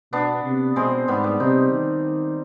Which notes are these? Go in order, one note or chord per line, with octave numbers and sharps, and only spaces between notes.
B2 B3 D4
C3
B2 G#3 C4
G#2 G3 B3
G3 B3
C3 C4 D#4
D#3